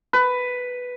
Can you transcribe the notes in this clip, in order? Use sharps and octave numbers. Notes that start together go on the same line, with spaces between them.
B4